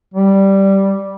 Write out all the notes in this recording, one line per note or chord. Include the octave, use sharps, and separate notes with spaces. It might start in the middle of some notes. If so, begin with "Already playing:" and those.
G3